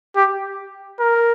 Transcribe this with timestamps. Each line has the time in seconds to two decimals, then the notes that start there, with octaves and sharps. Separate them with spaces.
0.16 G4
1.00 A#4